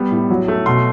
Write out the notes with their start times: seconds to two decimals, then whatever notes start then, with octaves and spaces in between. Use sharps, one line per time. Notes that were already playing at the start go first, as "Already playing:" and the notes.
Already playing: G3 B3
0.11 A2
0.30 F#3
0.48 A3
0.66 B2 C6